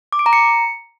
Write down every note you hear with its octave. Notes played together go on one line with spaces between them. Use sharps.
D6
D7
A#5
C#7